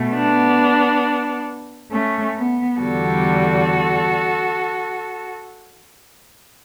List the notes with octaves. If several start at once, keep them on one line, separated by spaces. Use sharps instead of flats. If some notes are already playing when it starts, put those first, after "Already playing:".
Already playing: B2 A3
B3 D4
A3 C#4
B3
E2 D3 G3 F#4 A4